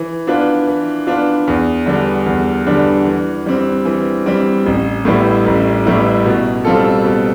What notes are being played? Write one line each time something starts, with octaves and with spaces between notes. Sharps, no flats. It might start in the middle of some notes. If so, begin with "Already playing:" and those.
Already playing: E3
B3 D4 F4 B4
E3
B3 D4 F4 B4
E2
D3 G3 B3 D4
E2
D3 G3 B3 D4
E3
G3 C4
E3
G3 C4
A1
A2 G3 B3 E4
A1
A2 G3 B3 E4
B2
G3 C4 F4 A4
B2